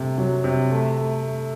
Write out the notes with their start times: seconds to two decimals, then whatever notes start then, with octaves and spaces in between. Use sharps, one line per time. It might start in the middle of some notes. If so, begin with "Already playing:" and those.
Already playing: C3 A3
0.18 F#3
0.44 C3
0.71 A3
0.97 A3
1.23 A3